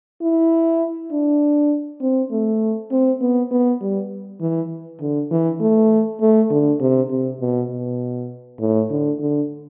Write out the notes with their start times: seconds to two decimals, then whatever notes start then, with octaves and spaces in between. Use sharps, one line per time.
0.22 E4
1.12 D4
2.01 C4
2.31 A3
2.91 C4
3.21 B3
3.51 B3
3.81 G3
4.41 E3
5.01 D3
5.31 E3
5.61 A3
6.21 A3
6.51 D3
6.80 C3
7.11 C3
7.41 B2
7.70 B2
8.60 A2
8.90 D3
9.20 D3